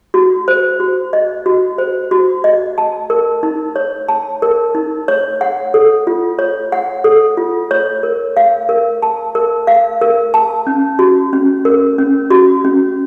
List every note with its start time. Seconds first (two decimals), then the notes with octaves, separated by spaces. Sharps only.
0.14 F#4
0.48 C5
0.80 F#4
1.13 D#5
1.46 F#4
1.78 C5
2.11 F#4
2.44 D#5
2.78 A5
3.10 A#4
3.43 D#4
3.76 C#5
4.08 A5
4.42 A#4
4.75 D#4
5.08 C#5
5.41 F#5
5.74 A4
6.07 F4
6.39 C#5
6.72 F#5
7.04 A4
7.37 F4
7.71 C#5
8.03 A#4
8.37 F5
8.69 A#4
9.02 A5
9.35 A#4
9.67 F5
10.01 A#4
10.34 A5
10.67 C#4
10.99 F#4
11.33 C#4
11.65 A#4
11.98 C#4
12.30 F#4
12.64 C#4